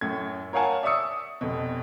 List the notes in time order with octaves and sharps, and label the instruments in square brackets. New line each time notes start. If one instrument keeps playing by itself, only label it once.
[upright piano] F#2 A2 G#6
A#4 C#5 F5 F#5 G#5 A5
D5 E5 C#6 D#6 E6 C#7
F1 B2